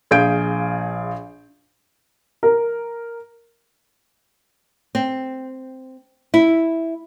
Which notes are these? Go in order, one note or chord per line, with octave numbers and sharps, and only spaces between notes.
A#1 G#4 F5 G6 D7
A#4
C4
E4